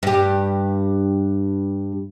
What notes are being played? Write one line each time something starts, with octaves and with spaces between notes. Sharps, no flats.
G2 G4